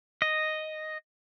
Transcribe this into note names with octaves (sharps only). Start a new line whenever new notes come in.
D#5